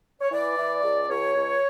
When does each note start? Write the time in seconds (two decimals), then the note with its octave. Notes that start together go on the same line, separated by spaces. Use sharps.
0.21 C#5
0.31 E3 D5
0.57 E3
0.84 C#2
1.09 C#2 C#5
1.36 C#2